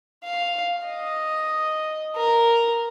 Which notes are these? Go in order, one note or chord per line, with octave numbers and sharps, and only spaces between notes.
F5
D#5
A#4